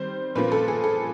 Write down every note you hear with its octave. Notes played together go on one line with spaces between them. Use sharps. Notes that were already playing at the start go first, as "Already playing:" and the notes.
Already playing: D#3 G3 C4 C5
A#2 F3 A#3 C#4 B4
A4
G#4
A4